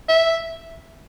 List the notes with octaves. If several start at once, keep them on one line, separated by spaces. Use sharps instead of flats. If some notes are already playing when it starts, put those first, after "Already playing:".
E5